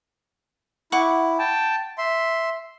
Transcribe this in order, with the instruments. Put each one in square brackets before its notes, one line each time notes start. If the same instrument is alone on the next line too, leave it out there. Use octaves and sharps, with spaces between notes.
[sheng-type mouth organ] E4 [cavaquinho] F#5 C#6 D6
[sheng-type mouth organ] G5 A5
E5 C6